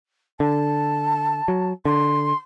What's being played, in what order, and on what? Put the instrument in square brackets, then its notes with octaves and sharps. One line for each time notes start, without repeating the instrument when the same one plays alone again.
[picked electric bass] D3 [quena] A5
[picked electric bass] F#3
[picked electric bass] D3 [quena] C6